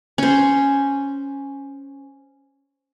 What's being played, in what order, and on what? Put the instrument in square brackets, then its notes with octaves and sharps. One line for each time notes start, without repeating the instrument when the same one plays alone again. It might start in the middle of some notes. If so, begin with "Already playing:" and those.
[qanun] C#4 C5